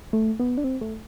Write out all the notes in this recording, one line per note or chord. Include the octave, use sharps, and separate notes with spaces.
A3
B3
D4
C4
A3